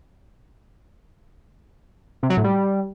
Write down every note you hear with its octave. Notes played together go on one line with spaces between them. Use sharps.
C3
F#3
A2
G3